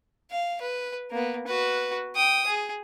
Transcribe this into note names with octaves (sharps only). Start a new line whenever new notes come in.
F5
B4
A#3 B3
F#4 B4
G5 D#6
G#4